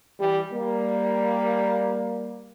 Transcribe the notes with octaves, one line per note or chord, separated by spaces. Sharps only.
E3 G3
G3 A#3